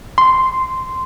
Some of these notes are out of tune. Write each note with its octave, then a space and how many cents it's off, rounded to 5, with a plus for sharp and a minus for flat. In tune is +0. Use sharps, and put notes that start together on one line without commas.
C6 -10